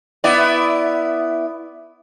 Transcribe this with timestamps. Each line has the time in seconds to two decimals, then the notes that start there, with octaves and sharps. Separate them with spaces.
0.24 B3 E4 D5